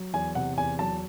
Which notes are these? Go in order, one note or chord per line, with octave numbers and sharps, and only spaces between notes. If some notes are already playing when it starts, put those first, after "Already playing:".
Already playing: F#3
E2 G#5
C3 F#5
E2 G#5
F#3 A5